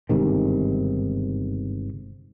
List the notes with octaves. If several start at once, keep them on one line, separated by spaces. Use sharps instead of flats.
G1 G#2 C3 D#3